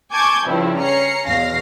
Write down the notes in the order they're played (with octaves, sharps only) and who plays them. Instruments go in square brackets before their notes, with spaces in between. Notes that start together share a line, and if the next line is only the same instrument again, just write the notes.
[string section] G#5 A5 C#6 D6 G6 G#6
G2 C#3 F3 E4
C#4 A#5 C7 C#7
E2 B2 F5 A#6 C7